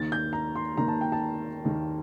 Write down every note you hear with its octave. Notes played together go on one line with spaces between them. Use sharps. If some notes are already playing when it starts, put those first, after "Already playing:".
Already playing: D#2 D#3 A#3 A6
G6
A#5
C6
D#2 D#3 A#3 A#5
A5
G5
A5
D#2 D#3 A#3